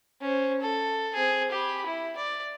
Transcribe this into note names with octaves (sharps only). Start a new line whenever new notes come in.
C#4 C5
A4
C4 G#4
G4 B5
E4
D5